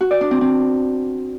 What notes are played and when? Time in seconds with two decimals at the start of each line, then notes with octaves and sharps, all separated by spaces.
0.01 F#4
0.11 D5
0.21 D4
0.31 C4
0.41 C4